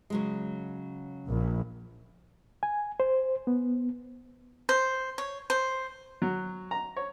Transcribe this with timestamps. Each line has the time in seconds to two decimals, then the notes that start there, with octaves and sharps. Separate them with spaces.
0.10 C#3 F#3 G#3
1.29 A#1
2.63 G#5
3.00 C5
3.47 B3
4.69 C5
5.18 C#5
5.50 C5
6.22 F#3
6.71 A#5
6.96 C#5